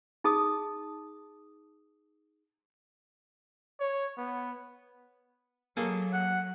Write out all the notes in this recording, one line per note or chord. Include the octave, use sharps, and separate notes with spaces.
D#4 G#4 A5 D#6
C#5
B3
F#3 A#3 G#4 A4
F#5